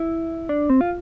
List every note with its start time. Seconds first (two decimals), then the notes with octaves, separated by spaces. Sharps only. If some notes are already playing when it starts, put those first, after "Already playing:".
Already playing: E4
0.49 D4
0.70 C4
0.81 F4